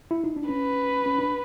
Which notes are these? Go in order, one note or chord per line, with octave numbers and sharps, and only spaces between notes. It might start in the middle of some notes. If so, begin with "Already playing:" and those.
E4
D#4
D4
C#4 B4
C#4
D4